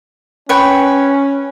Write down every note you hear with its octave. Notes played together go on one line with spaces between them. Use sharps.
C#4 B4 C#5 G5